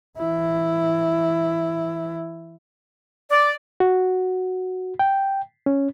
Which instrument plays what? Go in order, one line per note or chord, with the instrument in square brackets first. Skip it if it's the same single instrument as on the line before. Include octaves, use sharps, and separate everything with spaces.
[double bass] E3 E4
[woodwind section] D5
[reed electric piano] F#4
G5
C#4